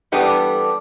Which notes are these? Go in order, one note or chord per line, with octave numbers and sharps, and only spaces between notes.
E3 G3 B3 D4 G4 A4